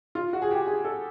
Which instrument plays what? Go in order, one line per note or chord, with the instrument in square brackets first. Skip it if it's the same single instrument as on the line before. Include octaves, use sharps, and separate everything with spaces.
[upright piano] F4
F#4
G#4
G4
G#4
A4